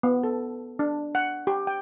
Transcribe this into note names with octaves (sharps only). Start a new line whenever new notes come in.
B3
A4
D4
F#5
G4
G5